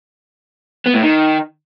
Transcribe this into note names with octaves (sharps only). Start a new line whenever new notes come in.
B3
A2
D#3